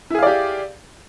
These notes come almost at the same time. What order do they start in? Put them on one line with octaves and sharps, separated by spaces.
E4 G#4 F5 D5 G4